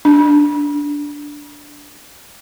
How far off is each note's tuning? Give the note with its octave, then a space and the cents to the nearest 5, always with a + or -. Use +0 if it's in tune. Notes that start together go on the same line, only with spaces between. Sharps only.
D4 -10